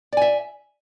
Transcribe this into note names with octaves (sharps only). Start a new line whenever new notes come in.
D5 E5 G#5